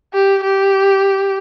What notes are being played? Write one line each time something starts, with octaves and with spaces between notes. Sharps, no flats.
G4
G4